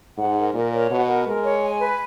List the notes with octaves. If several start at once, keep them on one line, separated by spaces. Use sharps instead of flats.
G#2 F#5
A#4
A#2 A#4
C#5
B2 F#5
A#4
G#3 A#4
C#5
G#5
B4